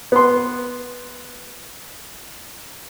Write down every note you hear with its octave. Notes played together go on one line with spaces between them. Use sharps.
B3 C6